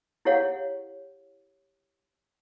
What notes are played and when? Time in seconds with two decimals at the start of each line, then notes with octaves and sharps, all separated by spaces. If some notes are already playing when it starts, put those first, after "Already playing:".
0.25 E4 G4 G#4 C#5 F5 F#5